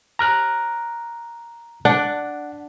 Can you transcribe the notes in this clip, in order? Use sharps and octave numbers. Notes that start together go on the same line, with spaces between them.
A#5 F6 F#6
D4 F#5